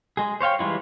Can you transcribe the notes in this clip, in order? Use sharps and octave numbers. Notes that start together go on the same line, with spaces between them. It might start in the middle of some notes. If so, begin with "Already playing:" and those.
G#3 G#4
C5 C#5 F5 G5
E3 G3 G#3 E4 F4